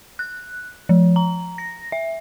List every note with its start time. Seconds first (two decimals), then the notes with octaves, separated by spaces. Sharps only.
0.19 F#6
0.89 F3
1.16 A#5
1.58 A#6
1.92 E5